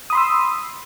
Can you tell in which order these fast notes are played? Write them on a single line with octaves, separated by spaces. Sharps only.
D#6 B5 C6 E6